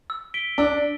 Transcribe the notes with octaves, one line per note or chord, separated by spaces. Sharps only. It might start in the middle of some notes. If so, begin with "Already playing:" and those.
E6
B6 D7 G7
D4 E6